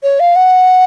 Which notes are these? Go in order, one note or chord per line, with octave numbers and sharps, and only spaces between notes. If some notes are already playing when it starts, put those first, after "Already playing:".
C#5
F5
F#5